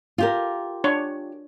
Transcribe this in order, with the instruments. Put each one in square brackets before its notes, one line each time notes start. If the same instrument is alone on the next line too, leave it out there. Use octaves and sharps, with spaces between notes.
[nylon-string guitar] F4 G4 A#4
[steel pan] D4 C#5